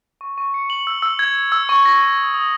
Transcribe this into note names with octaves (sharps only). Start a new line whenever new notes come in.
C#6
C#6
C#7
F#7
E6
E6
G#6
G#6
E6
C#6
A#6
C#6
D#6
D#6